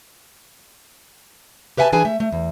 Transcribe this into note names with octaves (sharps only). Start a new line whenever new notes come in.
G4 B4 E5 F#5 G#5 A5
E3 D4 G#4 B4 G#5
A3 E5
A3
E2